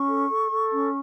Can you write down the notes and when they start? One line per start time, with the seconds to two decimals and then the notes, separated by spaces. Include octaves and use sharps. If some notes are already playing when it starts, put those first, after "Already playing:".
Already playing: C#4 C#6
0.09 A4
0.30 A4
0.51 A4
0.72 C#4